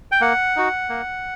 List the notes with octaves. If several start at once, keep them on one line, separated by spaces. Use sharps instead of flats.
G5
A#3 F#5
D#4 F#4
A#3